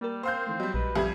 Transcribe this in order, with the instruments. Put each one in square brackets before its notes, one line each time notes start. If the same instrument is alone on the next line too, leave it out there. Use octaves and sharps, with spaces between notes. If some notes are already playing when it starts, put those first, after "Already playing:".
[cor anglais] G3 [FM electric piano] A#3 A#4
[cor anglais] C4 [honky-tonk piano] C5 F5 G6
[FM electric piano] D#3 E3 A3
[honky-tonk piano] F#3 G3 [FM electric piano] D#5
[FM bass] A#1 [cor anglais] B4
[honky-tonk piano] F2 G3 G#6 [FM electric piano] G4 A4 E5